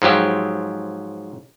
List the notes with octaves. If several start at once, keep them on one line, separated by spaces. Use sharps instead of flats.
G#2 F3 F#3 G4